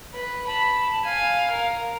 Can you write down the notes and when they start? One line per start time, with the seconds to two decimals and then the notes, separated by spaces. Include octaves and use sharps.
0.13 B4
0.47 A5 B5
1.05 F5 G#5
1.51 A#4